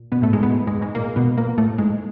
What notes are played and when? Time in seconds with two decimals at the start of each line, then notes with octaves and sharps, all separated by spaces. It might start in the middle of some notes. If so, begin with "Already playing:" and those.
Already playing: A#2
0.12 B2 B3
0.22 A2 A3
0.33 G#2 G#3
0.43 B2 B3
0.67 G#2 G#3
0.81 G#2 G#3
0.95 A#2 A#3
1.16 B2 B3
1.37 A#2 A#3
1.58 A2 A3
1.78 G#2 G#3